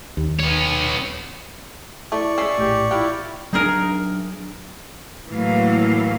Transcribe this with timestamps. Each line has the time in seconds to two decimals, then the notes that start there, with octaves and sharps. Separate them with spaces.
0.17 D#2
0.40 B3 C#5
2.12 A3 E4 D5 C#6
2.38 G#3 C#4 E6 B6 C7
2.58 A#1 A2 G4
2.91 E4 F4 G4 F6 F#6
3.53 F#3 C4 D4 D#4 G#4 A#4
5.28 A2 E3 F#3 A#3 F5